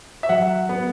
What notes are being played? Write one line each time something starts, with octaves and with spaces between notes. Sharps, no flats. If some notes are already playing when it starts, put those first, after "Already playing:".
E5
F#3 F#5
B3